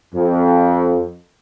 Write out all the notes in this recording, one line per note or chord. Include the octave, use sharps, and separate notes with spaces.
F2